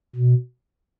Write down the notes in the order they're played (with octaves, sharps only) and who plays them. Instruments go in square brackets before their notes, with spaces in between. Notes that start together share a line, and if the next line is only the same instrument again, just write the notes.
[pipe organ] B2